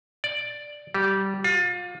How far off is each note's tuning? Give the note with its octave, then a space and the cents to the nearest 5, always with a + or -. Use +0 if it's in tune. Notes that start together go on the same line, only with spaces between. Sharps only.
D5 +5
G3 -15
F4 +30